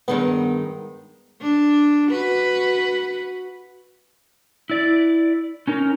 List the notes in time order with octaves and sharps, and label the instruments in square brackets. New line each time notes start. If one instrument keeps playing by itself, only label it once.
[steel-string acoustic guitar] G2 D#3 G#3 [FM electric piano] B3
[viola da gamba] D4
F#4 B4
[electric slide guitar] E4 D5
C#4 D#4 A#4